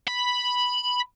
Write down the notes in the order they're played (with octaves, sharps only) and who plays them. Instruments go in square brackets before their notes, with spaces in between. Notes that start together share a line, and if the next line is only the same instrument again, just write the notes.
[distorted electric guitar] B5